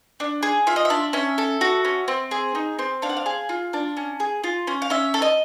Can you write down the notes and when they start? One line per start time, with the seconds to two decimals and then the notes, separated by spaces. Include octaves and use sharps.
0.20 D4
0.43 G#4
0.67 F4 E5
0.76 D#5
0.85 E5
0.90 D4
1.13 C#4 E5
1.38 A4
1.61 F#4
1.85 C#4
2.08 C4
2.31 G#4
2.55 D#4
2.79 C4
3.02 D4 F5
3.09 F#5
3.17 F5
3.26 G#4
3.49 F4
3.73 D4
3.97 C#4
4.20 G#4
4.44 F4
4.67 C#4
4.82 F5
4.90 C#4 E5
5.14 A4
5.22 D#5